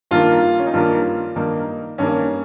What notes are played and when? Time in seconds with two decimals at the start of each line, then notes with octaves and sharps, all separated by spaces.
0.11 G2 D#3 A#3 F4
0.59 C#4
0.67 D#4
0.74 G2 D#3 A#3 F4
1.36 G2 D#3 A#3 D#4
1.98 G2 D#3 A#3 C#4